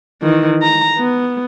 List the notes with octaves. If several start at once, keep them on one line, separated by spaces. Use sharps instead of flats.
D#3 E3
A#5
B3